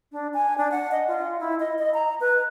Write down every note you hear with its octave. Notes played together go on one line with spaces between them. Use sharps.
D4
G#5
D4
F#5
D#5
F4
E4
D#5
D#5
A#5
B4